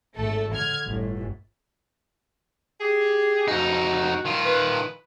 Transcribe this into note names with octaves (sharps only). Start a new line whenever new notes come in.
G#1 A3 A4
D3 F6 G#6
G1 A2
G4 G#4
F2 D#4 F#4
D#3 F4
B4